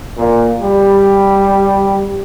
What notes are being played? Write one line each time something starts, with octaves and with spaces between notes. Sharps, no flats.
A#2
G3